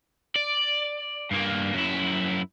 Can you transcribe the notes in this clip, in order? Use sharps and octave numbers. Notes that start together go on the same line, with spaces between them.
D5
G2 A#3
F#2 E4